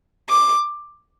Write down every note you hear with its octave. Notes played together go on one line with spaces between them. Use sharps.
D6